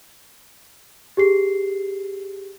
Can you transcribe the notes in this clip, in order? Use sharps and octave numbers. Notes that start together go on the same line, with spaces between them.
G4 G#4 C7